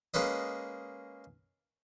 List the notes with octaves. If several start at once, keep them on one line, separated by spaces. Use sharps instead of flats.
G#3 A#3 C#4 B4 D#5